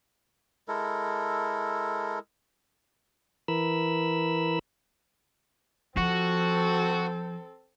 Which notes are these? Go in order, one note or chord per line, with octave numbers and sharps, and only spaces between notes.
G#3 E4 A4 A#4
E3 A#4 B5 E6
F3 C4 F#4 A4